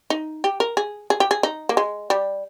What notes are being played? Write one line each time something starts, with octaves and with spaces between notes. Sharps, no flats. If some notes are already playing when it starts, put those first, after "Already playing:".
D#4
G4
A#4
G#4
G#4
G4
G#4
D#4
A#3
G#3
G3